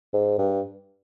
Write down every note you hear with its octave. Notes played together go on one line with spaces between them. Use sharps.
G#2
G2